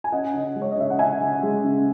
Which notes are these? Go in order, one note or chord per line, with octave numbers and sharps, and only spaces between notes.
G#5
C#4 D#5 F#5
C#3
G#3
C#5
D#5
C#3 E5
F#5
C#4 E5 G#5
C#3
G#3
C#3